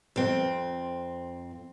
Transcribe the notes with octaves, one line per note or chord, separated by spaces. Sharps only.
F2 C4